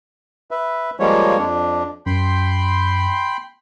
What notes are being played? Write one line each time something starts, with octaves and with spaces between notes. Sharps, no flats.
B4 E5
F3 G3 G#3 A#3 C#5
F2 D4
F#2 G5 B5 C6